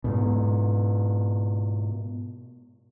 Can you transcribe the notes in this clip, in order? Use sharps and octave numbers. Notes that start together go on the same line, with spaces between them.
G#2 B2